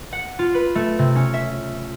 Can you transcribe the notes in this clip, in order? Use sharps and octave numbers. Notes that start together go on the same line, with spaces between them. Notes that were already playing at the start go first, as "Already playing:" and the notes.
F#5
F4
B4
A3
C3
C#4
E5